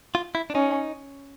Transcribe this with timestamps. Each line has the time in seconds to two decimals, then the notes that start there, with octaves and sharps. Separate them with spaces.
0.15 F4
0.35 E4
0.50 D4
0.55 C#4 D#4